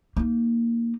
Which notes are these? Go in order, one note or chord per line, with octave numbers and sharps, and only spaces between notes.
A#3 D#4